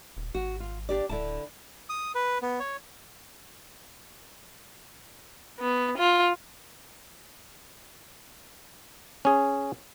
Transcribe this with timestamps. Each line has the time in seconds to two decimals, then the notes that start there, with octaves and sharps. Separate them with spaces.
0.17 D#1
0.35 G#1 F#4
0.60 F4
0.89 D4 G4 D5
1.09 D1 D3 E4 A5
1.89 D#6
2.15 B4
2.42 B3
2.60 C#5
5.59 B3
5.97 F4
9.25 C#4 G#4